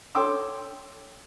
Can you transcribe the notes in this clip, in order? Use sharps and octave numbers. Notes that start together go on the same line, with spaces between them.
A4 C#5 G5 C6 D6 E6